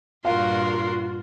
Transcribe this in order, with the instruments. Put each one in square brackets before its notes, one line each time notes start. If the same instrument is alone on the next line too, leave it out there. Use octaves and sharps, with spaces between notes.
[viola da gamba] G2 A#2 [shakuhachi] F4 [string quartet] F#4 A#4 C6 [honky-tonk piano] F5